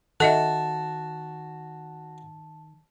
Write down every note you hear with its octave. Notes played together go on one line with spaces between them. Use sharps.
D#3 F#4 A4 D#5 E5 A5